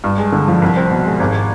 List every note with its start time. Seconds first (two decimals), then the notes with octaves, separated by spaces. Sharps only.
0.04 G2
0.18 G#3
0.32 D3
0.48 F3
0.62 C2
0.77 C4
0.91 B2
1.05 G#3
1.20 G#1